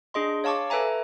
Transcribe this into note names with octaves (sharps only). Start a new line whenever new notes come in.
D4 G#4 D#5 C6
C#5 F5 A5 C#6 D6
A4 B4 E5 G#5 A#5